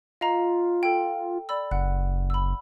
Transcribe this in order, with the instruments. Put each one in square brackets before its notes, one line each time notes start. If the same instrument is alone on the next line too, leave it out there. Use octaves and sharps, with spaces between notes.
[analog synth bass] F4 [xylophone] D#5 F5 A#5
[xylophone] A4 G5
D5 B5 E6
[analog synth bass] F#1 [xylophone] F#5 F#6
[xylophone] B5 E6